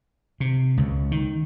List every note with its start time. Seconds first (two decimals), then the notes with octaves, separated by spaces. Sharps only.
0.40 C3
0.78 C#2
1.12 D#3